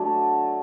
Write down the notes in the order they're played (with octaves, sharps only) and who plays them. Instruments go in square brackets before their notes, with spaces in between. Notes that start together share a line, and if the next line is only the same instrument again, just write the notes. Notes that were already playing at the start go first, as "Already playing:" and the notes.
Already playing: [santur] F#3 A3 D4